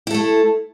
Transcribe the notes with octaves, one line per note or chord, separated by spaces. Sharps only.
A3 E4 A4